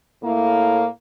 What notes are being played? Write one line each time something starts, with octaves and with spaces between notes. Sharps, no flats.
A2 A#3